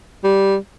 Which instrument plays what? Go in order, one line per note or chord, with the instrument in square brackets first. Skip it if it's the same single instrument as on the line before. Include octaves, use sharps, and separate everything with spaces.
[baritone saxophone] G3